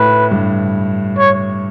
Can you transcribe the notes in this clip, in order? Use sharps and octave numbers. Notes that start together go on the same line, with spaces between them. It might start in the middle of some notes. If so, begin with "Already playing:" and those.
Already playing: A2 B4
G2
C#5